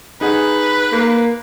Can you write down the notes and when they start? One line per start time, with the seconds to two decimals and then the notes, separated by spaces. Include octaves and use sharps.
0.21 D#4 G#4 B4 F#5
0.92 A#3